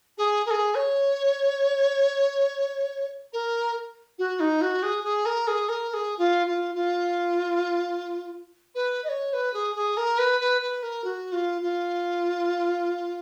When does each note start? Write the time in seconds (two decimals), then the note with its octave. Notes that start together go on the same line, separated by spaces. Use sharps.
0.17 G#4
0.45 A#4
0.50 G#4
0.74 C#5
3.32 A#4
4.18 F#4
4.39 D#4
4.61 F#4
4.82 G#4
5.03 G#4
5.25 A#4
5.47 G#4
5.68 A#4
5.88 A#4
5.93 G#4
6.18 F4
6.46 F4
6.74 F4
8.74 B4
9.04 D#5
9.08 C#5
9.32 B4
9.53 G#4
9.75 G#4
9.96 A#4
10.18 B4
10.40 B4
10.60 B4
10.82 A#4
11.04 F#4
11.32 F4
11.61 F4